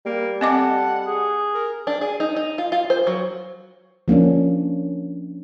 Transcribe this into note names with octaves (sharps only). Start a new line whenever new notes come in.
G3 A#3
C4 A4 D#5 F#5 D6
G#4
A#4
D4
G#4
D#4
D#4
F4
F4
C5
F#3
F3 A#3 C#4 D4